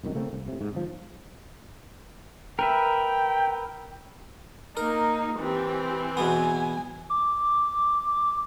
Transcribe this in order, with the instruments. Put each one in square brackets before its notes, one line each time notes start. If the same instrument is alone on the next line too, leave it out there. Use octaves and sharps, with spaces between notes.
[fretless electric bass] F1 C2 F#2 D#3
C#3 A3 A#3 C4
C2
A2 C3
G#2
G1 F3
[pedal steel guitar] A#4 B4 E5 [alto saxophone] G5
[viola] A#3 D#4 [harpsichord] A#4
[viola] E3 C4 [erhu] G4
[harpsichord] E2 B2 B3 [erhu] G#5
[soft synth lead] D6